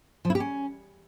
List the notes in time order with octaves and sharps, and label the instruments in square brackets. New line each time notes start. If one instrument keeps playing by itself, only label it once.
[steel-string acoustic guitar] F3
E4
G4
C#4